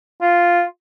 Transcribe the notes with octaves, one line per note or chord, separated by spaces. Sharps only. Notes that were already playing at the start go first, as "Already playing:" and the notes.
F4